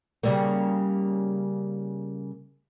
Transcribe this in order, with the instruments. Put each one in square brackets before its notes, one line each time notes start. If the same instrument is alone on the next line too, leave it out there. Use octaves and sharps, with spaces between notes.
[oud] C#3 G3 A#3